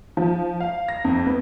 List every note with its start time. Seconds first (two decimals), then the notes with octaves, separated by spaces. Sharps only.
0.17 F3
0.60 F5
0.88 A#6
1.05 F2
1.26 B3